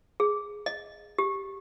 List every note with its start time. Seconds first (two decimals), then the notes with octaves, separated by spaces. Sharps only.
0.20 G#4
0.66 D#5
1.18 G4